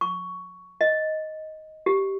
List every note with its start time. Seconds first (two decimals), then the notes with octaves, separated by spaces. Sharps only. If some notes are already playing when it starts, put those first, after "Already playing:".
0.01 C#6
0.81 D#5
1.86 G4